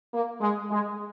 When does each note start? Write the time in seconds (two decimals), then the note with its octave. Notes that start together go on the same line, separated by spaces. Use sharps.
0.12 A#3
0.40 G#3
0.71 G#3